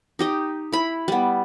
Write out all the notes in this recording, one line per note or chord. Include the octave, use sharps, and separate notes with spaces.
D#4 G4 D#5
E4 B5
G3 B3